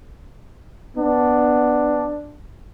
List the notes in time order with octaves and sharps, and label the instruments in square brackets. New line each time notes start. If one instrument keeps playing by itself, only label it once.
[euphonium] B3 [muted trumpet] D4